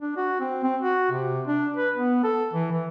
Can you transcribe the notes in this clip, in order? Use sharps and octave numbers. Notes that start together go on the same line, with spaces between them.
D4
F#4
C4
C4
F#4
C3
D4
B4
B3
A4
E3
E3